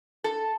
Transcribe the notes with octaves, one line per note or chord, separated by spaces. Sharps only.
A4